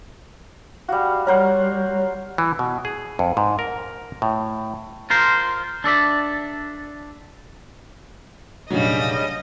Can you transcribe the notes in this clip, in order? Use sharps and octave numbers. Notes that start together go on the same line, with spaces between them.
G3 F#4 F5
G3 A#4 C5 C#5 F#5
E3
B2
G#4
F2
G#2
A#4
A2
F4 A#4 C5
D4 A4 D5 E5
F1 A#1 C#3 F#3 G3 D#5